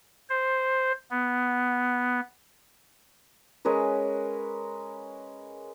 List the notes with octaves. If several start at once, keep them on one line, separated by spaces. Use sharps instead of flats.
C5
B3
G#3 C#4 A#4 B4